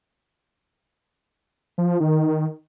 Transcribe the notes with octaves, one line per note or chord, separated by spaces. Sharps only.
F3
D#3